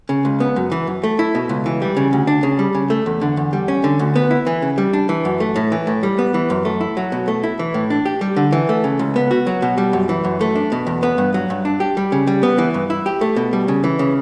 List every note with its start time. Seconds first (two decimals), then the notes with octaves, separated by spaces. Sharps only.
0.09 C#3
0.25 C#2
0.40 B3
0.56 F#2
0.72 E3
0.87 F#2
1.04 A3
1.19 E4
1.35 B2
1.49 C#2
1.66 E3
1.82 G3
1.97 C#3
2.13 D2
2.27 D4
2.43 C#3
2.59 G3
2.75 C#3
2.90 A3
3.06 E2
3.21 D3
3.37 E2
3.53 G3
3.68 C#4
3.84 D3
3.99 D2
4.16 B3
4.31 E4
4.47 E3
4.62 C#3
4.78 G3
4.93 D4
5.09 E3
5.25 F#2
5.40 A3
5.56 A2
5.72 E3
5.87 A2
6.03 G3
6.18 B3
6.34 E3
6.50 F#2
6.65 A3
6.81 E4
6.97 F#3
7.12 B2
7.28 A3
7.43 E4
7.59 E3
7.74 A2
7.90 D4
8.05 G4
8.21 G3
8.36 D3
8.52 E3
8.69 A3
8.84 C#3
8.99 C#2
9.16 B3
9.31 F#4
9.47 F#3
9.62 B2
9.78 G3
9.93 F#2
10.09 E3
10.24 F#2
10.41 A3
10.56 D4
10.72 B2
10.87 E2
11.03 B3
11.18 G2
11.34 F#3
11.50 G2
11.65 D4
11.80 G4
11.97 G3
12.12 C#3
12.27 G3
12.43 B3
12.58 E3
12.74 G2
12.90 E4
13.06 G4
13.21 A3
13.36 B2
13.53 G3
13.68 C#3
13.84 E3
13.99 C#3